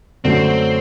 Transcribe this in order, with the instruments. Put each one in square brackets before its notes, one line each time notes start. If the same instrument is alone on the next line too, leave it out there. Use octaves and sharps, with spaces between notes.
[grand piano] F#2 D3 F#3 A3 C#4 [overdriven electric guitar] C4